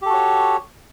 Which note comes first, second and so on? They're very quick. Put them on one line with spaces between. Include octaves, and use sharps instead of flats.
G4 A4 F#4 C#5